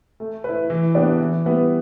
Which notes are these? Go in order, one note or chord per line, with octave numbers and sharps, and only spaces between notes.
A3
E4 B4
E3
B3 D4 G4 D5
E3
G3 B3 E4 B4